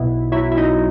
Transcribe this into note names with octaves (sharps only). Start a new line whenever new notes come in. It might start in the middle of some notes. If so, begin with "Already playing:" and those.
Already playing: B1 B2 E4
F#3 E4
E4
D#4